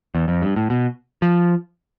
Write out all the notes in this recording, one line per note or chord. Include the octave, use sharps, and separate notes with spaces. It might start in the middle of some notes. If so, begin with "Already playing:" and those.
E2
F2
G2
A2
B2
F3